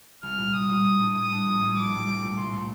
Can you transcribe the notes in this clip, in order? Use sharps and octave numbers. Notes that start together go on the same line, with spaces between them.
C2 F6
A#2 G3
C2 D#6
A#2 G3
A2
G3 D4
A2 D#6
G3 D4
A#1
A2 G3
A#1 D6
A2 G3
C2
A#2 A3
C2 C6
A#2 A3